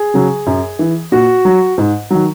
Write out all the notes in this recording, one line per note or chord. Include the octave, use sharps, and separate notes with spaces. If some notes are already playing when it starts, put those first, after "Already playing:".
Already playing: G#4
C#3 F#3
F#2
E3
A#2 F#4
F#3
G#2
D#3 F#3